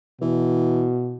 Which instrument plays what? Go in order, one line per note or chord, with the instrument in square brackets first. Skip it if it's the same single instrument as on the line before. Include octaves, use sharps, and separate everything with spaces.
[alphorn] B2 [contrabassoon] E3